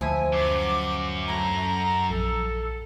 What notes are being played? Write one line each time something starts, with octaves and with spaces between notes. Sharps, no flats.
D2 F3 E4 E5 G#5
F#2 D6
A3 E4 F#4 A#5
A#1 A4